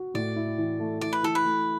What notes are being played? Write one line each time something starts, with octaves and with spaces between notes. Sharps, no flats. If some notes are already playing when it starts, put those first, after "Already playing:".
Already playing: F#4
A2 D5
E4
E3
A3
E3 D5
B4
E3 A4
B4
A3